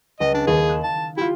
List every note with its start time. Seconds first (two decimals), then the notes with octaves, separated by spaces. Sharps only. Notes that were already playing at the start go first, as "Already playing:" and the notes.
0.20 C#2 D#5
0.34 D4
0.47 D#2 G#4
0.69 F#6 E7
0.83 A5
1.17 E4 F4 G4